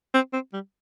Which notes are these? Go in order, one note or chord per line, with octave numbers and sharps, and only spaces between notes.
C4
C4
G3